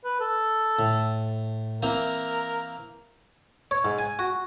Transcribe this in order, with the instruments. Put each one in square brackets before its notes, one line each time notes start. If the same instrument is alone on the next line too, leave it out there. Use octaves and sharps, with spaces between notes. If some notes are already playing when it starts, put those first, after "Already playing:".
[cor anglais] B4
A4
[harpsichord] A2
[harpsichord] E3 A#3 C4 [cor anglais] A#4
[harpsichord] C#5
G#2
G#5
F#4